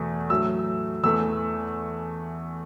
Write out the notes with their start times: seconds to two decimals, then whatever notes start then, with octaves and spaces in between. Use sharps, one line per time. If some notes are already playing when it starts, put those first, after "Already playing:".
Already playing: E2 B2 A3
0.30 A2 F#3 A3 E6
1.04 E2 E3 A3 E6